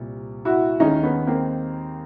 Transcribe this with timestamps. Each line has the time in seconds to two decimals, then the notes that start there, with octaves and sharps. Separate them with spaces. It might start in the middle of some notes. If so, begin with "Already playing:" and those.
Already playing: C2 A#2 G3
0.45 E4 F#4
0.80 D#2 D#3 G#3 C#4 D#4
1.03 B3 C#4
1.27 A#3 C4